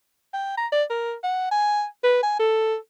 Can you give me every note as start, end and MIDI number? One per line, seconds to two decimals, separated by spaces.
0.34 0.53 79
0.58 0.67 82
0.72 0.84 74
0.90 1.13 70
1.24 1.47 78
1.51 1.84 80
2.04 2.22 71
2.23 2.37 80
2.39 2.76 69